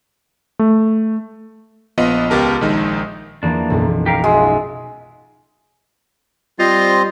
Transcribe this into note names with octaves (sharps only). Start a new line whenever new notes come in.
A3
A#1 B3 F4 D#5
C#2 B3 G4 A#4 A5
A#1 D#3 G#3 D#4
E2 E3 F3 A#3 D4
F#1 B1
G4 A#4 F5
G#3 D#4 F4 F#4 E5
G3 C4 F4 C5 D#5